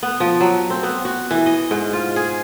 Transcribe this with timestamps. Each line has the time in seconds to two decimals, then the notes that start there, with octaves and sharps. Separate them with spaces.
0.03 B3
0.20 F3
0.41 F#3
0.70 C4
0.83 B3
1.05 F#4
1.31 E3
1.46 D#5
1.71 G#2
1.93 F4
2.16 G#4